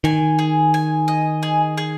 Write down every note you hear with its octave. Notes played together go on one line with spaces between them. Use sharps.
D#3 G#5
G#4
G#5
D#5
G#4
G#4